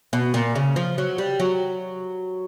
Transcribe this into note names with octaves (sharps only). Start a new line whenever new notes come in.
B2
A#2
C#3
F3
F#3
G3
F#3